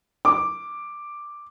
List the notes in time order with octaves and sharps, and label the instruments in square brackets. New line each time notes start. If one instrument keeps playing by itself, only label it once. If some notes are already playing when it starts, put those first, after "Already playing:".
[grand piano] D6